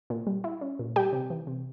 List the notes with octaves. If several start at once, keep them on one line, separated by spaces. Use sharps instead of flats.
A#2
G3
E4
C#4
A#2
G3 G4 G5
C3
E3
C3